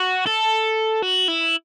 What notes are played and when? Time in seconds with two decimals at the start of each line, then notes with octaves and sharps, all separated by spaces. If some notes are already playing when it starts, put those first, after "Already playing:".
Already playing: F#4
0.27 A4
1.02 F#4
1.28 E4